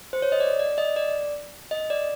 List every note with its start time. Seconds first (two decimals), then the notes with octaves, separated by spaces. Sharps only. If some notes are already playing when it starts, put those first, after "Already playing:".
0.13 C5
0.22 C#5
0.32 D#5
0.40 D5
0.59 D5
0.78 D#5
0.96 D5
1.71 D#5
1.90 D5